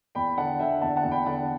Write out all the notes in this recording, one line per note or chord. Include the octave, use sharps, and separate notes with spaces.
E2 G5 B5
D3 F#5 A5
D3 E5 G5
E2 F#5 A5
F#5 A5
E2
G5 B5
D3 F#5 A5